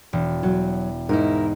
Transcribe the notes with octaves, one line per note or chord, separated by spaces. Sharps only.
E1
F#3
G#2 D#4 E4 A#4